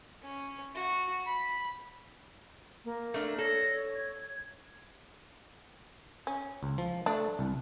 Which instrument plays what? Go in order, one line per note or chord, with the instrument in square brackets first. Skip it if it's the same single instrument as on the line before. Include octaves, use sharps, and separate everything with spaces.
[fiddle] C#4
F#4
B5
[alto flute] A#3
[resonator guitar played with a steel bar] A3 D4 [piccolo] F6
[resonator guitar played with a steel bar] A4 [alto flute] C#5 [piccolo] A#6
[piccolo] G#6
[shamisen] C#4
[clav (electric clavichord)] C#2
F3
[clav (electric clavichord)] A3 [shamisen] D4
[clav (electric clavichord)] C2